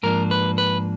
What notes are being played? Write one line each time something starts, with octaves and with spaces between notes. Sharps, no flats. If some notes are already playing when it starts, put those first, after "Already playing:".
G#2 F3 A#3 D4 A#4
B4
B4